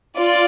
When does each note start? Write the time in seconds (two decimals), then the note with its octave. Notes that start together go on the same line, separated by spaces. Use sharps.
0.15 F4 D5